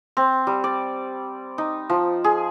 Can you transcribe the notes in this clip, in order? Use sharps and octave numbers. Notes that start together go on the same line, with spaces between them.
C4
G3
D5
D#4
F3
G#4